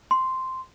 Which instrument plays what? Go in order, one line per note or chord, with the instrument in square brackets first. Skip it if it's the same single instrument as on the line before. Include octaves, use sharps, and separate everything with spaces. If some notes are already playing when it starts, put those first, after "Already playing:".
[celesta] C6